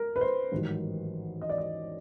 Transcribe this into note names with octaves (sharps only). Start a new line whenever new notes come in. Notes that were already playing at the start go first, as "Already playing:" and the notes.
Already playing: A#4
B4
C5
A1 G#2 D#3 F#3
D#5
D5
D#5